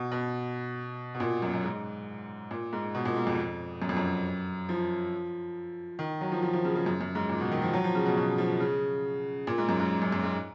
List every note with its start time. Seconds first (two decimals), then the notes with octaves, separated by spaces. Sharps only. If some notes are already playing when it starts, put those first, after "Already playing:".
Already playing: B2
0.11 B2
1.14 B2
1.20 A#2
1.42 F#2
1.54 F#2
1.64 G#2
2.51 A#2
2.73 G#2
2.95 B2
3.05 A#2
3.16 G#2
3.27 F2
3.82 F#2
3.89 F2
3.97 F#2
4.69 F3
5.99 D#3
6.21 F#3
6.32 F3
6.42 F3
6.53 F3
6.64 C#3
6.75 C#3
6.86 F#2
7.01 F#2
7.15 G#2
7.29 A#2
7.40 B2
7.51 D#3
7.62 F3
7.73 F#3
7.84 F3
7.95 C#3
8.06 B2
8.17 B2
8.38 F3
8.60 C#3
9.47 A#2
9.58 G#2
9.69 F#2
9.80 G#2
10.02 F#2
10.12 F#2
10.24 G#2